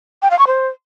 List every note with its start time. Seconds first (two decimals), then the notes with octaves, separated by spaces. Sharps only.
0.22 G5
0.31 F5
0.39 C#6
0.47 C5